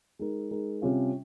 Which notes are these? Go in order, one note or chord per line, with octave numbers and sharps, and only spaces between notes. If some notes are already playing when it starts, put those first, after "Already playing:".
G#3 D#4 A#4
G#3 D#4 A#4
C3 G3 C#4 F4